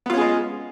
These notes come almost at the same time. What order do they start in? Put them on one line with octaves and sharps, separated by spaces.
B3 F4 C#4 G#4 G#3